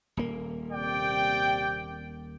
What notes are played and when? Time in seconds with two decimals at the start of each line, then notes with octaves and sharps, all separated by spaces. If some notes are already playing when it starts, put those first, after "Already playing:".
0.17 D#1 A#3
0.72 C3 D5 G5